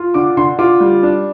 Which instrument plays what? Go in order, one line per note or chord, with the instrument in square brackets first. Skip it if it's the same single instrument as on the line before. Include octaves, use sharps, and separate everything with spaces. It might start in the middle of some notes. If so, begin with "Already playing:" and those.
Already playing: [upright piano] F4
D3 D6
D3 C6
F4 D6
G3
D4